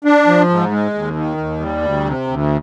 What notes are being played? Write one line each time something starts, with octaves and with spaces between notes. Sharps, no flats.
D4
F3
G#2
G#3
D#2
D#3
D#2
G3
D2
C3
D2